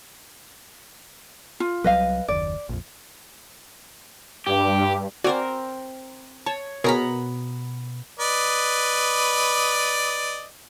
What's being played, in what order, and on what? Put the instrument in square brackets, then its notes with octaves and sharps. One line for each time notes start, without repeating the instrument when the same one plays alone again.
[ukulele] F4
[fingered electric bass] C2 F#3 G3 [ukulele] B4 D#5 F5
[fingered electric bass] F#1 D#2 [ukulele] D5
[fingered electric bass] A#1 F2
[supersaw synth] G2 [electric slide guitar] G4
[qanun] C4 A#4 C5 [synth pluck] F#4 D5 G#5
[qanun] C#5 [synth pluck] A5
[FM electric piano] B2 [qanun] B3 A#5 B5 [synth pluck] G#4 A#4 C#5
[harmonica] B4 D5 D#5